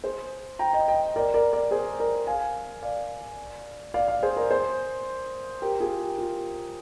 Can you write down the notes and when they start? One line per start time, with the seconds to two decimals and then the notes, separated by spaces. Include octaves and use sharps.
0.04 G#4 C5
0.59 G5 A#5
0.73 D#5 G5
0.88 D#5 G5
1.16 A#4 D5
1.34 A#4 D5
1.53 A#4 D5
1.71 G#4 C5
1.99 A#4 D5
2.27 F5 G#5
2.83 D5 F5
3.94 D5 F5
4.08 D5 F5
4.22 G#4 C5
4.36 A#4 D5
4.51 G#4 C5
5.62 G4 A#4
5.80 F4 G#4
5.99 G4
6.18 F4